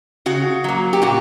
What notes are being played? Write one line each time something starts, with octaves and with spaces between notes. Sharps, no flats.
C#3 F#4
F#3 A#3
G4
A#2 F#4